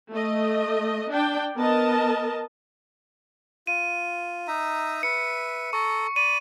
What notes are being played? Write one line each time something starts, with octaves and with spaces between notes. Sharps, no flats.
A3 D#5
D4 G5
B3 A#4 D#5 A5
F4 D#7
D#4 E5 A#5
B4 E5 C#7
A4 A#5 C#6
D5 B5 D#7